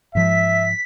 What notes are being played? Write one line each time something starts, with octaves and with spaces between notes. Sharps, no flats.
G#2 F3 E5 B6